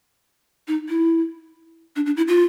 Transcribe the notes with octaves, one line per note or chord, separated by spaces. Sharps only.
D#4
E4
D4
D4
E4
F4